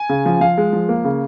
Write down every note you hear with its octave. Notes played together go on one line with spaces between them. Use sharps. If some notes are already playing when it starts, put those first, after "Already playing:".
Already playing: G#5
C#3
F3
F3 F5
G#3
F3
A#3
C#3